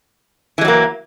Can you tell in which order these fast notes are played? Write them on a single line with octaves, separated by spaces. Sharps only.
E3 G#3 F#3 A#3